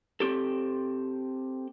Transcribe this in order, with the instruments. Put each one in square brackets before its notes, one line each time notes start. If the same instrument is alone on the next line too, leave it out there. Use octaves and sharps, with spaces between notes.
[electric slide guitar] C4 G4 A4